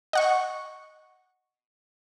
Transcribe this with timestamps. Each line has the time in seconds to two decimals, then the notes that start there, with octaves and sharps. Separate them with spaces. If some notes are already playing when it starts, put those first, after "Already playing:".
0.13 D#5 F#5 C#6